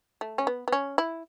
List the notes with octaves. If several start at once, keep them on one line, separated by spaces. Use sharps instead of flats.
A3
C#4
B3
B3
C#4
E4